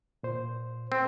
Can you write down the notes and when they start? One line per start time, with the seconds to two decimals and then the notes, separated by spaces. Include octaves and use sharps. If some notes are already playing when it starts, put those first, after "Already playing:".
0.23 A#2 C5
0.92 C4